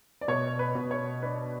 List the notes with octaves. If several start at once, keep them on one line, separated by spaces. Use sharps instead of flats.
D5
B2 C#5
B4
B2
C#5
D4 B4